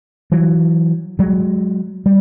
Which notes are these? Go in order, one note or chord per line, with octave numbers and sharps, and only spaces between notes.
E3 F#3
F#3 G#3
G3